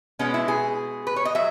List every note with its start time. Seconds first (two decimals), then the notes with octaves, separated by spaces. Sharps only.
0.19 B2 G#3 B3 C#4
0.34 E4
0.48 G#4
1.07 B4
1.16 C#5
1.25 D#5
1.35 F#3 E5